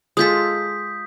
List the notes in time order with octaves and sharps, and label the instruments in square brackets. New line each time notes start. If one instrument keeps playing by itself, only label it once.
[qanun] G#3 F4 A4 [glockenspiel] D#6 G6 B6